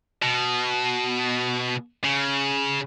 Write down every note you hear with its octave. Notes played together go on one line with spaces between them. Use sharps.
B2
C#3